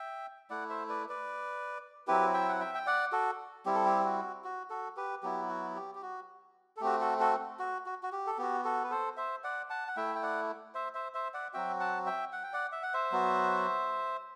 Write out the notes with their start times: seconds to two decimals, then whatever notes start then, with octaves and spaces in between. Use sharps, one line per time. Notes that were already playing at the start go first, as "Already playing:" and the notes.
Already playing: E5 G5
0.50 A3 E4 D5 F#5
0.70 C5 E5
0.89 B4 D5
1.09 B4 D5
2.07 F#3 C4 E4 G4 B4
2.34 E5 G5
2.49 F#5
2.60 E5 G5
2.75 G5
2.86 D5 F#5
3.12 F#4 A4
3.66 G3 C4 E4 G4
3.75 A4
3.85 G4
4.05 F#4
4.44 F#4
4.70 F#4 A4
4.97 G4 B4
5.23 F#3 B3 E4 G4
5.49 F#4
5.75 G4
5.95 G4
6.02 F#4
6.77 A4
6.81 A3 C4 F#4 G4
7.00 F#4 A4
7.20 F#4 A4
7.59 F#4
7.86 F#4
8.03 F#4
8.12 G4
8.27 A4
8.38 B3 F#4 G4
8.64 F#4 A4
8.84 B4
8.91 A4 C5
9.17 C5 E5
9.44 D5 F#5
9.70 F#5 A5
9.88 F#5
9.96 A3 E4 E5 G5
10.15 G5
10.23 D5 F#5
10.74 C5 E5
10.94 C5 E5
11.14 C5 E5
11.34 D5 F#5
11.53 F#3 C4 F#4 E5 G5
11.80 F#5 A5
12.06 E5 G5
12.33 F#5
12.43 G5
12.53 D5 F#5
12.72 E5
12.83 F#5
12.94 C5 E5
13.12 F#3 B3 F#4